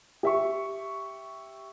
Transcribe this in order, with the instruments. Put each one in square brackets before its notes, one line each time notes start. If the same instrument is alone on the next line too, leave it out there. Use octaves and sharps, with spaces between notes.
[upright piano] G4 E5 C#6